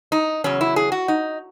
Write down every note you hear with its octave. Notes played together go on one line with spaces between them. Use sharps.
D#4
E2 C#3 F#3 C#4
E4
G#4
F#4
D#4